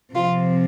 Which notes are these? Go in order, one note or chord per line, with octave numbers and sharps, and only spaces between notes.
C3 F3 C4 F4